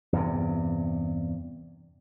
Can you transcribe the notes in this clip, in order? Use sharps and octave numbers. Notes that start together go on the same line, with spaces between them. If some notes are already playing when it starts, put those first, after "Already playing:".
E2 G2 C3